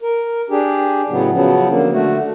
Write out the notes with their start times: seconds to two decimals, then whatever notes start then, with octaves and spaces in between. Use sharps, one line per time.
0.02 A#4
0.50 D4 G4 G#4
1.09 A2 C#3 F#3 B3
1.32 C#3 F3 F#3 B3
1.69 D3 A#3
1.92 D3 A3 F#4